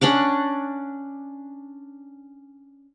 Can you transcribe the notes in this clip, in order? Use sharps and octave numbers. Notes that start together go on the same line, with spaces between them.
C#4 D4 F#5 D6